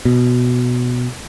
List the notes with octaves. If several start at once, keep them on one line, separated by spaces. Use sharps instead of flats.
B2